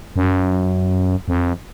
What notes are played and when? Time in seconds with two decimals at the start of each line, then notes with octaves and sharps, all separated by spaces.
0.16 F#2
1.28 F2